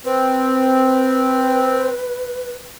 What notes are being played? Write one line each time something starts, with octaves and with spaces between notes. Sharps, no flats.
C4 B4